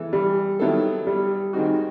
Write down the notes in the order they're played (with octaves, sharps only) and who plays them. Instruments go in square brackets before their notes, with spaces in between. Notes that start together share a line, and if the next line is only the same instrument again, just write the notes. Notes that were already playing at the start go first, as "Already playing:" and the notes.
Already playing: [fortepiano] E3 G#3 B3 E4 A4
[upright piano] G3
[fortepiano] D#3 F#3 B3 E4 A4
[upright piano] G3
[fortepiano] D#3 G#3 C4 D#4 F#4